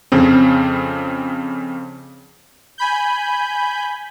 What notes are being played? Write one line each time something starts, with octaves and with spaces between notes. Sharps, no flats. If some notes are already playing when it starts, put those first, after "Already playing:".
F2 C#3 C4
G#5 B5 G6